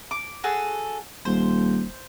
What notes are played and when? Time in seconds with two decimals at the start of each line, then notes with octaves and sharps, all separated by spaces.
0.11 D6
0.44 F#4 G#4 A4
1.25 D#1 C5